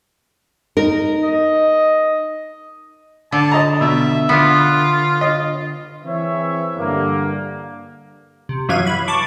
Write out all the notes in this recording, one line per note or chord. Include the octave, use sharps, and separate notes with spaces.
D#4 A#4
D#5
D3 A5
D#5 A#5
B2 E5
D3 B3 F4
D#5
E3 C4 G#4 B4 C#5 E5
G2 D3 A#3
C3
F#2 E3 F#3 F5 G#6 D#7
B5
A5 C#6 D6